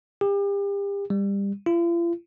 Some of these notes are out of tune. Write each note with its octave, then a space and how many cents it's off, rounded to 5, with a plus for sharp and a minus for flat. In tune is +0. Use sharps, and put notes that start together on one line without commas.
G4 +35
G3 +25
F4 -45